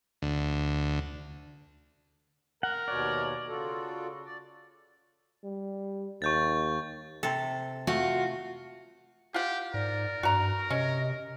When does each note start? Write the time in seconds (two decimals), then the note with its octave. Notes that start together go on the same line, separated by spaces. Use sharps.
0.22 D2
2.63 A#4 F#5
2.88 D#2 B2 C#5 D5
3.48 C#3 F4 F#4 A4
4.26 D5
5.44 G3
6.22 D#2 C#6 G6 A6
7.23 C3 A4
7.87 A3 F4 F#4
9.34 F4 G4 F#5
9.74 G#2 A#4 D5
10.23 G2 F#4 A#5
10.70 C3 C#4 D#5